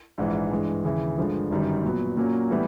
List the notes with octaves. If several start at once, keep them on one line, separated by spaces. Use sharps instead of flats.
A#1 G#2 E3
G2 E3 G#3
D#2 C#3 E3
G1 G2 D3 F3 G#3
G1 F#2 D#3 G3
A#2 F#3 B3
A#2 F#3 A#3 C#4
A2 E3 G3 B3